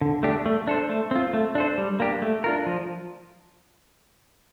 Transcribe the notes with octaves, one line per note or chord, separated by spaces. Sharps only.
D3
A3 D4 G4
A3
D4 A4 C5
A3
C4 F4
A3
D4 A4 C5
G3
A#3 D4 G4
A3
D4 F4 A#4
F3